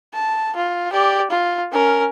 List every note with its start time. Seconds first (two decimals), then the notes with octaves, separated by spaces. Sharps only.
0.13 A5
0.56 F4
0.92 G4 D5
1.30 F4
1.72 C#4 A#4